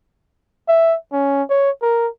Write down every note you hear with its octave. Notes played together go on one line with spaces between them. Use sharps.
E5
C#4
C#5
A#4